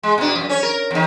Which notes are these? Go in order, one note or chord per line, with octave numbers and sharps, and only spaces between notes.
G#3
B2 D4
F#2
C#4 C#5
A#4
E2 D#3